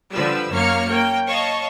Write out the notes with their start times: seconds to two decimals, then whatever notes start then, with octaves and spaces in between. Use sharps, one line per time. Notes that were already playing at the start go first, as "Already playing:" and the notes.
0.12 D3 F3 G3 B4 E6
0.51 F#2 A#3 C#5 F5 F6 C#7
0.90 A#3 C#5 G5
1.26 C#5 D#5 F5 A5 C#6